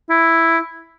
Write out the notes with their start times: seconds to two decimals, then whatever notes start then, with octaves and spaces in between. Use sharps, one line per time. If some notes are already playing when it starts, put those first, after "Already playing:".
0.10 E4